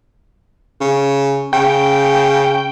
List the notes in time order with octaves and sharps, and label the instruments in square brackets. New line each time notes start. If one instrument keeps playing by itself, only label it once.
[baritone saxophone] C#3
[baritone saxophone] C#3 [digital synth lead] G5